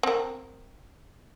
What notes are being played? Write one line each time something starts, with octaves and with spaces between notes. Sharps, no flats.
C4 A#4